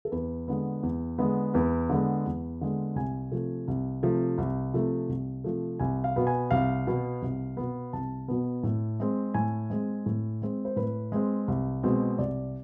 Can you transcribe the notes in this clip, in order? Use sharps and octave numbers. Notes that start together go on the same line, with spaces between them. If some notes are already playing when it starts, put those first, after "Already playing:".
A4
E2 B4
D3 G#3 B3
E2
D3 G#3 B3
E2 B4
D3 G#3 B3
E2
D3 G#3 B3
C2 G#5
C3 F3 A3
C2
C3 F3 A3
C2
C3 F3 A3
C2
C3 F3 A3
C2 G#5
F5
B2 B3
G#5
C2 F5
B2 B3
C2
B2 B3
C2 A5
B2 B3
A2
G#3 C4
A2 G#5
G#3 C4
A2
G#3 C4
C5
A2 B4
G#3 C4
C2
B2 G#3 C4
C2 D5